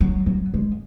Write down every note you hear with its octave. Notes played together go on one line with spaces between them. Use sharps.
F#3
F#3
G#3